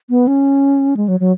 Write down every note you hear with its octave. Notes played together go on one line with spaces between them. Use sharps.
B3
C#4
G#3
F#3
F#3